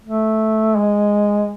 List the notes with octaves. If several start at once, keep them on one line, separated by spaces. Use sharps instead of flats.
A3
G#3